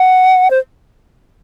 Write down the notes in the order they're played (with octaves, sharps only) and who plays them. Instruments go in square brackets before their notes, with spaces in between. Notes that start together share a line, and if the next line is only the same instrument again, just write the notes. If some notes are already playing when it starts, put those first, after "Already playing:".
Already playing: [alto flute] F#5
C5